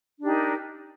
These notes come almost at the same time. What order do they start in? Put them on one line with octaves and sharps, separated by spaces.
D4 G4 D#4 A#4